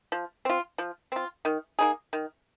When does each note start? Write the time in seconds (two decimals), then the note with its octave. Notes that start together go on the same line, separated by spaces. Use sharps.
0.12 F3
0.45 C4 F4
0.78 F3
1.12 C4 F4
1.45 D#3
1.79 A#3 D#4 G#4
2.13 D#3